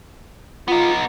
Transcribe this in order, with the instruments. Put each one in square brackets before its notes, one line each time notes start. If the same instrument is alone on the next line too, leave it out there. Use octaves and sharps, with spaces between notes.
[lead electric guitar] B3 D#4 [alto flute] F4